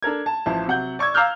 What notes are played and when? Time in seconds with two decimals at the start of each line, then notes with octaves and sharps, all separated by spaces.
0.03 D4 A4 A#4 G#6
0.26 A5
0.46 A1 F3 E4 A5
0.66 C3 F#3 F#5 G6
0.99 D5 C#6 E6 G#6
1.14 F5 A#5 D6 E6 F6 G6